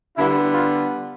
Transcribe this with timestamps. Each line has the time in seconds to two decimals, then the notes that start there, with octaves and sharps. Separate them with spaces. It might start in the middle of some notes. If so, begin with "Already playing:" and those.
0.17 D3 G3 B3 E4
0.54 F4